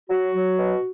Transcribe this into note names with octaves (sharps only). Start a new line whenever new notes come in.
F#3 F#4
F#3
B2